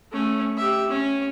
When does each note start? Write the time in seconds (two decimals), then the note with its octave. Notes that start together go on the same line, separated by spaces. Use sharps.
0.12 A3 C#4
0.58 G4 E5
0.88 C#4